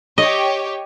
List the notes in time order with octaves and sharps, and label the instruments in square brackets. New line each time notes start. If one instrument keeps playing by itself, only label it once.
[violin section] G4 C#5 [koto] D#5